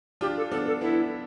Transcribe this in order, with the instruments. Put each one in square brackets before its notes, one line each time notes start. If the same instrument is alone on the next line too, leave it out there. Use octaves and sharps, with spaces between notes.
[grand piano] D4 F4 [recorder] G4
[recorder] A4
[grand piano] B3 D4 [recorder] A4
[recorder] A4
[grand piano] B3 D4 [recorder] E4